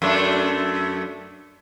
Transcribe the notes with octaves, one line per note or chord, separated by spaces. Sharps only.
F#2 A3 D4